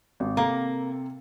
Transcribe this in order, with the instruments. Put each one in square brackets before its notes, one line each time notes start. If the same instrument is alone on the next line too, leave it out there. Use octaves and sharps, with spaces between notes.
[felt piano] G#1
[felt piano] C3 A4 [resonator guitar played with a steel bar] A#3